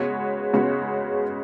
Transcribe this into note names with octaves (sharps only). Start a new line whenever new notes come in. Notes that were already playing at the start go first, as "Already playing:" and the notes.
Already playing: C#3 G#3 B3 F#4 C#5
C#3 G#3 B3 F#4 C#5